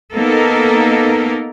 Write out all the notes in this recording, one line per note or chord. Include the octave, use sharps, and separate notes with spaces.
A#3 B3 D#4 A4 A#4